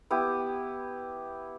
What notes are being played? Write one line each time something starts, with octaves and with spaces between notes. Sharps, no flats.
B3 E4 G4